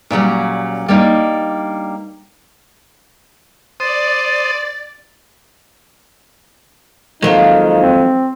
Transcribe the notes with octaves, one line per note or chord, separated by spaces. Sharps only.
A#2 C#3 F#3 G3
G3 A#3 D4 D#4
C5 D5 D#6 A6
F2 D#3 F3 F#3 G#3 A#3 D#4
C4